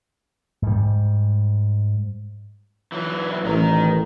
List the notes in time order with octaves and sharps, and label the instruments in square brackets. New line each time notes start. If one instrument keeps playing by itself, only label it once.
[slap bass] G#2 G3
[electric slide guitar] E3 F#3
[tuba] A1 [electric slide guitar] D#3 A#5